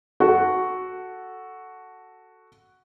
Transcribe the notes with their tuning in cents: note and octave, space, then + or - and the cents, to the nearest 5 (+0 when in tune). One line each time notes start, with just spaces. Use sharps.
F#4 +0 A4 +0